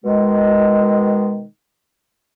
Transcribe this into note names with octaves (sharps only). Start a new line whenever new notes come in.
B2 D#3 G#3